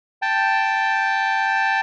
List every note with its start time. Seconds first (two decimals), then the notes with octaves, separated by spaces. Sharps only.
0.22 G5 A5